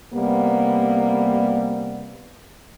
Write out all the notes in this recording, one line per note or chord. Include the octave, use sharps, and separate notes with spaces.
C3 G3 A#3 B3